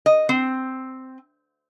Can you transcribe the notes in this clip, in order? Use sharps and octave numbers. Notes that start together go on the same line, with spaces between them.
D#5
C4